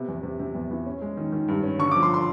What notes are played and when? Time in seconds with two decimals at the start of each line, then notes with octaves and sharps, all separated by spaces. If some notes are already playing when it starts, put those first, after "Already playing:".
Already playing: C3 B3
0.08 E2
0.23 C3
0.40 C3
0.55 E2
0.71 E3
0.86 C#4
1.02 G#3
1.17 D#3
1.32 D#3
1.48 G2
1.63 C#4
1.79 D3 C#6
1.91 D6
1.95 F3
2.03 C6
2.14 C6